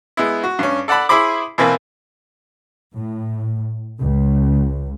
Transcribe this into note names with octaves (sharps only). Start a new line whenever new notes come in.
G#3 B3 E4
F#4
G2 C#4
A4 D5 F#5 A5 B5
E4 G#4 C5 B5 D6
B2 E3 A#3 C4 B4
A2
C#2